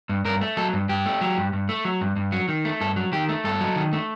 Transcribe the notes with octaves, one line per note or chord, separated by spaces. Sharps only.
G2
G2 A#4
A3
F#3 A4
G2
G2 G4
A3
F#3
G2
G2
A3
F#3
G2
G2
F#3
D#3
A3
G2 A4
F#3
D#3 G4
A3
G2 A4
F#3
D#3
A3